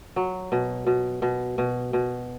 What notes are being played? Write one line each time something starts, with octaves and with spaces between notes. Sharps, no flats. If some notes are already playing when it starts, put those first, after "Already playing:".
F#3
B2
B2
B2
B2
B2